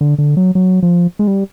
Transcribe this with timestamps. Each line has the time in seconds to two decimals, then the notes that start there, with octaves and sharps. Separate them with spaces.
0.01 D3
0.18 D3
0.37 F#3
0.55 F#3
0.83 F3
1.19 G#3
1.27 G3